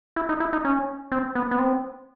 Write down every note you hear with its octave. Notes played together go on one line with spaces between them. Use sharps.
E4
D#4
E4
D#4
C#4
C4
B3
B3
C4